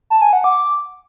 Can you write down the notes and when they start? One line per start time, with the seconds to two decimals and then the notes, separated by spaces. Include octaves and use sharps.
0.10 A5
0.22 G#5
0.33 F#5
0.44 D6